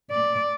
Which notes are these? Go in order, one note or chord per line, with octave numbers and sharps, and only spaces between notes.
D5